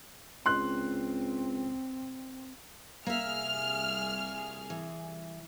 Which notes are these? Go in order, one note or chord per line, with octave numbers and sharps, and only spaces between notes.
C#2 C4 C6 F#6
C2 A#3 G#4 E5 F6
E3